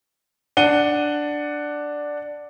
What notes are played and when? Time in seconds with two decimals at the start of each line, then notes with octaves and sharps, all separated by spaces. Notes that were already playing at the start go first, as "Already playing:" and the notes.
0.57 D4 F#5 D#7 G7